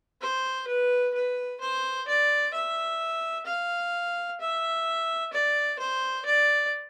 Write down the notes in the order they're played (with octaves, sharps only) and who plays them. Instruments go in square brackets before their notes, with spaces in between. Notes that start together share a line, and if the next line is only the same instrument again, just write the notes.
[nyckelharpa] C5
B4
B4
C5
D5
E5
F5
E5
D5
C5
D5